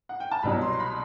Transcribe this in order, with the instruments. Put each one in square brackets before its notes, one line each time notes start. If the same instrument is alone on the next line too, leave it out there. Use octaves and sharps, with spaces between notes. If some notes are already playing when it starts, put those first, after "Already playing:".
[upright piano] F#5
G5
A5
C2 B2 F#3 B5
C6
C6
B5